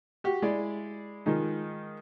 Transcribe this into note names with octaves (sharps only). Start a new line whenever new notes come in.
F#4 G4
G#3 E4 D5
D#3 F3 G#3 D#4